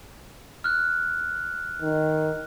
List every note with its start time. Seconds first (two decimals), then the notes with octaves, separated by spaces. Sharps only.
0.64 F6 F#6
1.82 D#3